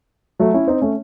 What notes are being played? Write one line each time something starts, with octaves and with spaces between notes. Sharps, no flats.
F#3 A3
C#4 E4
C4 D#4
A3 C#4